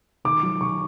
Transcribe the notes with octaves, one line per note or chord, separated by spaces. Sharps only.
D#3 D6
F#3
D#3 C#6